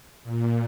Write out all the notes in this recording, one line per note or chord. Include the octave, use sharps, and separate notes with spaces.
A#2